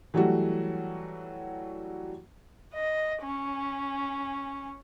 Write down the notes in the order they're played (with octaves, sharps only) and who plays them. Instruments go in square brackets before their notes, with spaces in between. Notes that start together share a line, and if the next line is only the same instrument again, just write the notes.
[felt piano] E3 F#3 G3 A3 F#4
[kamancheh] D#5
C#4